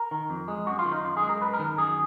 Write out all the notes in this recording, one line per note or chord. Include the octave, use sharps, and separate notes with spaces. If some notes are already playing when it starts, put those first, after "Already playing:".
Already playing: A#4
D#3
F2
G#3
F#2 F#4
F4
D#3
D#4
F#2 F4
G#4
G#3
A#4
F#2 B4
A#4
D#3
A#4
F#2 G#4